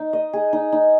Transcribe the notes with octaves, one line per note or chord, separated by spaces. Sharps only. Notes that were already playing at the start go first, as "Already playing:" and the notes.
Already playing: D#4
D#5
G#4
D#4
D#4